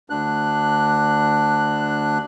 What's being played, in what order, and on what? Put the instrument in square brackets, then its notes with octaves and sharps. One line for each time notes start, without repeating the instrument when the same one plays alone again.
[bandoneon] D2 D4 F#6